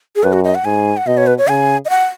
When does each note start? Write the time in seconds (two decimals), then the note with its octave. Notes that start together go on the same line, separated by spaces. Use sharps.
0.16 G#4
0.23 F#2 B4
0.33 F#4
0.44 D#5
0.55 F#5
0.65 G#2 G#5
0.97 F#5
1.07 B2 D#5
1.17 C#5
1.27 B4
1.38 C#5
1.48 C#3 G#5
1.85 D#5
1.90 F#5